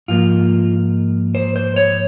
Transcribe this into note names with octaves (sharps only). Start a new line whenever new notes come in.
G#2 F3 A#3 F4
C5
C5
C#5